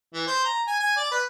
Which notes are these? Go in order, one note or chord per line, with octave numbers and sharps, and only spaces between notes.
E3
C5
A#5
G#5
G#5
D5
B4